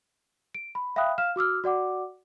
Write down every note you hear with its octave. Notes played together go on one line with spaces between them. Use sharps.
D7
B5
E5 F5 G5 B5 D#6 F#6
F5 F6 E7
F#4 D6 E6 F6
F#4 D5 F#5 D6